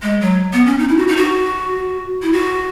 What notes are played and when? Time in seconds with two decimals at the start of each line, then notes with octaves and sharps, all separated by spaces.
0.02 G#3
0.21 F#3
0.53 B3
0.66 C#4
0.79 D#4
0.89 E4
0.98 F#4
1.07 D#4
1.17 F#4
2.22 E4
2.33 F#4